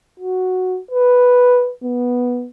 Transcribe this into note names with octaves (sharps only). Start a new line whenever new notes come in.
F#4
B4
B3